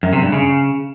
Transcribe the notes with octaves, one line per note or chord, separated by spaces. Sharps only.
F#2
C3
G2
C#3